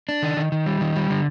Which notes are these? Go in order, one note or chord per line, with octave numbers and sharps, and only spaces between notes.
D4
D#3
D#3
D#3
G3
D#3
G3
D3